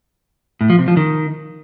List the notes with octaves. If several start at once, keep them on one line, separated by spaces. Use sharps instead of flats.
A2
F3
C3
F3
D#3